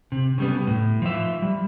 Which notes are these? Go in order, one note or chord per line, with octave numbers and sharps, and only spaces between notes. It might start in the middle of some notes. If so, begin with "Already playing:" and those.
C3
C#3 G3 B3
A2
F3 E5
G3